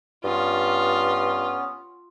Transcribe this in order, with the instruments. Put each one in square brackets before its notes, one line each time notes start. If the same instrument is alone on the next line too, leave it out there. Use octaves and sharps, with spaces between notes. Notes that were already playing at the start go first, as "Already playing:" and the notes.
[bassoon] G2 [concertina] B3 C#4 [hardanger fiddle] F4